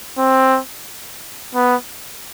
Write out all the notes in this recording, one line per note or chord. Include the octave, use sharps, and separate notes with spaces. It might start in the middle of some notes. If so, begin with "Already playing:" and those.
C4
B3